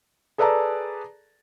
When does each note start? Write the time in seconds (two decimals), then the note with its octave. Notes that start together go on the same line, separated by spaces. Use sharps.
0.38 G#4 A4 B4 D5 A5 A#5